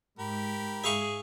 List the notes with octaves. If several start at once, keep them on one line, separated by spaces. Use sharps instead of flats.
G#2 G4 A#4 B5
G#2 G#4 E5 F5 C#6